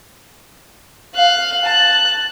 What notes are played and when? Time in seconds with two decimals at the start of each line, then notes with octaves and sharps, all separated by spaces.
1.15 F5 F#6
1.65 A5 F#6